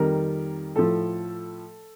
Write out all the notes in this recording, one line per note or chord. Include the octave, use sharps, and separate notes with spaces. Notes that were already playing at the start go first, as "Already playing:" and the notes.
Already playing: F2 D#3 G3 A#4
A2 F3 A4